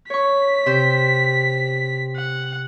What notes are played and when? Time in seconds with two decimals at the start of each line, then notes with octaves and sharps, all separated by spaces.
0.10 C#5 C#6 B6
0.66 C3 C5 G6
2.16 F#5